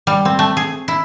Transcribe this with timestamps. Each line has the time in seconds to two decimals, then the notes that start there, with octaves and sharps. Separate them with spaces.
0.07 G3
0.25 C4
0.39 A3
0.57 G#4
0.88 E4